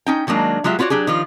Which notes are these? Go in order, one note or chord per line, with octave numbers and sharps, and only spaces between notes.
C#4 D#4 G5
D#3 F#3 G#3 A#3 D4
F#3 G#3 F4 G4 E5
B3 F4 F#4 C#5 D5
F#3 D4 G4 G#4
D#3 F3 F4